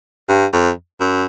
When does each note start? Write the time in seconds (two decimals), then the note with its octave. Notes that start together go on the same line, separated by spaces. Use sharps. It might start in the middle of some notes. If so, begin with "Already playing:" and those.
0.29 G2
0.53 F2
1.00 F#2